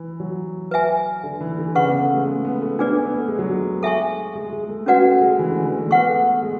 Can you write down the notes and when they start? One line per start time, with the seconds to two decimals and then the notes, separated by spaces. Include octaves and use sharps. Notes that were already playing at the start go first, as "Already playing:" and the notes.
Already playing: E3
0.20 F#3
0.71 B4 E5 G#5
1.24 D3
1.40 E3
1.58 D3
1.75 C#3 B4 F#5 C#6
1.89 B3
2.02 A3
2.15 G#3
2.27 A3
2.45 B3
2.62 A3
2.79 B3 D4 G#4 B4 D5
2.92 A3
3.05 B3
3.18 A3
3.28 G#3
3.39 F#3
3.49 G#3
3.83 A4 E5 G#5 C#6
4.35 G#3
4.53 G#3
4.69 A3
4.86 C#4 F#4 B4 D5 F#5
5.04 A3
5.21 G#3
5.39 E3
5.52 D3
5.65 E3
5.78 A3
5.91 B3 B4 F#5 C#6
6.08 A3
6.42 G#3